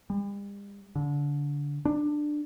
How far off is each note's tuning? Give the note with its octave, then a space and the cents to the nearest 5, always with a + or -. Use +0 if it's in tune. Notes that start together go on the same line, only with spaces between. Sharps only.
G3 +45
D3 -25
D4 +15